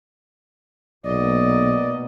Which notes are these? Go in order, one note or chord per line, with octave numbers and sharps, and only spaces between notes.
B1 B2 A#3 B3 D5 D#5